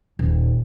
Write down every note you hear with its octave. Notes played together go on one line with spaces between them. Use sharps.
D#1